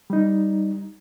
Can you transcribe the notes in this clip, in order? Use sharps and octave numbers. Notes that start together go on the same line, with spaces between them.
G3 D#4